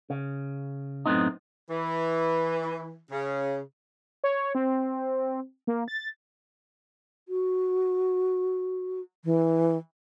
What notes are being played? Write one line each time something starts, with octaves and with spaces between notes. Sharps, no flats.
C#3
F#2 A2 B3 C4 D#4
E3
C#3
C#5
C4
A#3
A6
F#4
E3